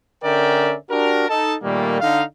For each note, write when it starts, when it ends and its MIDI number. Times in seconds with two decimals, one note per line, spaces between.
0.23 0.74 50
0.23 0.74 61
0.23 0.74 70
0.23 0.74 74
0.23 0.74 76
0.23 0.74 79
0.90 1.26 62
0.90 1.26 66
0.90 1.26 67
0.90 1.26 70
1.28 1.54 63
1.28 1.54 69
1.28 1.54 81
1.63 1.97 46
1.63 1.97 51
1.63 1.97 55
1.63 1.97 57
1.63 1.97 58
2.00 2.23 50
2.00 2.23 63
2.00 2.23 77